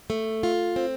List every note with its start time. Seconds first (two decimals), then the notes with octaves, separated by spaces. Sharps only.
0.10 A3
0.43 F4
0.76 C4